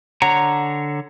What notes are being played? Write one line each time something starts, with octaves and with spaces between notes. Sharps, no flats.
D3 C#5 F#5 A#5